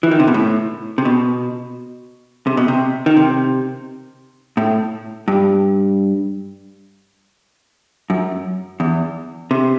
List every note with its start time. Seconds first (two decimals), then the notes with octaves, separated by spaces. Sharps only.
0.03 E3
0.11 D#3
0.20 C3
0.27 B2
0.34 A2
0.98 C3
1.05 B2
2.47 C3
2.57 B2
2.68 C3
3.06 D#3
3.17 C3
4.57 A2
5.28 G2
8.10 F#2
8.80 E2
9.51 C3